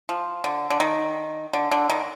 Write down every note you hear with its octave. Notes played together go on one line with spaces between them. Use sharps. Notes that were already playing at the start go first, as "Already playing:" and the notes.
F3
D3
D3
D#3
D3
D3
D#3